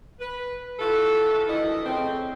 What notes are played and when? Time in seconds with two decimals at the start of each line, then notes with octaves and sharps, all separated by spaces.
0.20 B4
0.80 E3 F4 F#4 A4
1.47 D2 D#3 E3 E4 D#5
1.85 F2 A2 C#3 C4